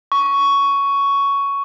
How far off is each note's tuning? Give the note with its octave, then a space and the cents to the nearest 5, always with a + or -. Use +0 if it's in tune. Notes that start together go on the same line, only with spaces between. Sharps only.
C#6 +10